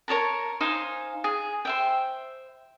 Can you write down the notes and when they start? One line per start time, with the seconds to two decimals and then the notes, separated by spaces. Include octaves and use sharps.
0.08 A#4 C#5 A5 A#5
0.60 D#4 C5 F5 G#5
1.24 G#4
1.65 C5 E5 G5